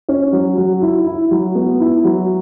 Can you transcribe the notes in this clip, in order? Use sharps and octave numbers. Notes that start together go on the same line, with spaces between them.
C#4
F#3
F#3
E4
E4
F#3
B3
E4
F#3